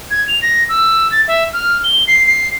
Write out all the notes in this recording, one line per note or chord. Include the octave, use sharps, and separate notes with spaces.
G#6
F7
A#6
E6
A6
E5
F6
G7
C7
C7